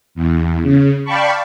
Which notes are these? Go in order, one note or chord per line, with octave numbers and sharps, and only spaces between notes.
E2
C#3
D5 F5 G5 A5 B5 C#6